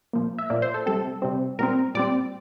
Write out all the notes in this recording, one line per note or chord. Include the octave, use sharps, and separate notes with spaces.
A#2 F3 A#3
E5
A#2 F3 A#3 D5
C5
A4
C3 G3 C4 A4
C3 G3 C4
A#2 G3 C4 A#4
A#2 G3 C4 D5